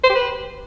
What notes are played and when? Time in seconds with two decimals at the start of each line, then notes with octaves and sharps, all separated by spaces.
0.04 C5
0.09 G4
0.15 B4